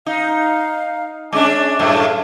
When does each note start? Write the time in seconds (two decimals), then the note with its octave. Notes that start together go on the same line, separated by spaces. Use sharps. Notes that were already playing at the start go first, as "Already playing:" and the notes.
0.06 D#4 F5
1.33 G#3 C#4 D4 D6
1.79 F#2 A2 A3
1.94 F5